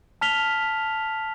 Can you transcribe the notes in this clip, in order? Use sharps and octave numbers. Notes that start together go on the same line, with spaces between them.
A5 F6 B6 F7 G7